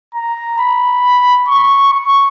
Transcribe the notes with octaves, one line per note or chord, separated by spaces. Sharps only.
A#5
B5
C#6
C#6